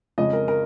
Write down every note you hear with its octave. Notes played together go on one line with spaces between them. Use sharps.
F2 C#3 G#3 D#5
A#4
A#4